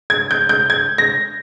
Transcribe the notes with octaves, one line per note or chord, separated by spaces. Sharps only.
G#6
G6
G6
G#6
A#6